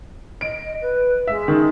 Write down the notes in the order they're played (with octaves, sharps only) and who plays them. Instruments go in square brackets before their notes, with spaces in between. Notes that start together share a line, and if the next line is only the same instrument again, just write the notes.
[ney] D#5 [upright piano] D7
[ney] B4
[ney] G#3 [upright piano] E5
[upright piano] D#3